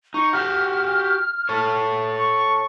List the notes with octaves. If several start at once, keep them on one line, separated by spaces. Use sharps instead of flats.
D#4 C#6
F#4 G4 F6
A4 C#5
C#6